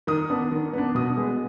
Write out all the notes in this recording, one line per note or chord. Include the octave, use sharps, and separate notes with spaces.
D#3 D#6
B3 D4
D#3
B3 D4
B2 D#6
G#3 B3